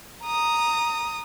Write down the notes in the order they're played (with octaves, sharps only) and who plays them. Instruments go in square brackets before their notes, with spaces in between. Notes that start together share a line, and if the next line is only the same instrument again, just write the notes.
[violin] A#5 D#6